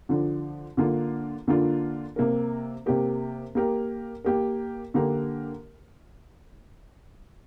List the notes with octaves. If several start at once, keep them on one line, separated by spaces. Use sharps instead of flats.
D3 F3 D4
D3 A#3 D4 F4
D3 A#3 D4 F4
C3 A#3 G4 A#4
C3 A#3 G4 A#4
A#3 G4 A#4
A#3 G4 A#4
D3 A#3 G4 A#4